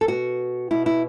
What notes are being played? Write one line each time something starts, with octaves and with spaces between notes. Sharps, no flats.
A4
B2 B3 F#4
B2 B3 E4
E4